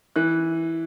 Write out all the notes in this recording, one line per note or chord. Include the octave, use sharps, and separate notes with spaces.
E3 F#6